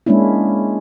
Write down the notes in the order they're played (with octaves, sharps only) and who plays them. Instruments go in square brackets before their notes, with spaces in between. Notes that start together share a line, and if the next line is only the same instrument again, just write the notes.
[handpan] G#3 A#3 C#4 D4 E4